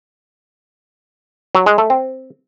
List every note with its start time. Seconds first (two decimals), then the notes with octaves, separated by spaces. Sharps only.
1.55 F#3
1.66 G#3
1.78 A3
1.90 C4